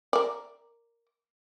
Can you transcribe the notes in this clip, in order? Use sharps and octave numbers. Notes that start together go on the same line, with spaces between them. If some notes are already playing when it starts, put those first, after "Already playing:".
A#4 D5